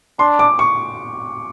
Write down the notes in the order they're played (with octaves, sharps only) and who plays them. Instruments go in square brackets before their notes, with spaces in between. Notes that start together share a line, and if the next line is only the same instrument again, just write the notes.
[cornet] D4 [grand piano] C6
[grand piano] D6
C#6